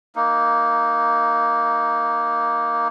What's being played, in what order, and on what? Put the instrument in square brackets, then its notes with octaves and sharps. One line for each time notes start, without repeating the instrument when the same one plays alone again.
[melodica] A#3 D#4